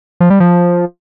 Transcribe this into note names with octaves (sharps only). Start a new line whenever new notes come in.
F3
G3
F3